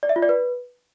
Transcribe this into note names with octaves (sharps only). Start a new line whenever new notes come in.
D5
E5
F4
D5
B4